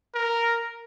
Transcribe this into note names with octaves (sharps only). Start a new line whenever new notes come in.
A#4